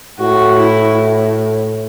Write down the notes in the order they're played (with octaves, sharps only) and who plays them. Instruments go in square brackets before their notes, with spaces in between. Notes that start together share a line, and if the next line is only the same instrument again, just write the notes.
[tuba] A2 [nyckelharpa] F#4
[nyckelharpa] E4